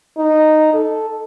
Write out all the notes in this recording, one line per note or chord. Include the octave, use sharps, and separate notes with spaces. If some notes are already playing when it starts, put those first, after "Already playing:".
D#4
A4